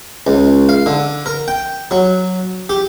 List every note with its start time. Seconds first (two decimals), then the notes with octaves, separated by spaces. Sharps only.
0.27 C#2
0.69 F5
0.86 D3
1.26 A#4
1.48 G5
1.91 F#3
2.69 G4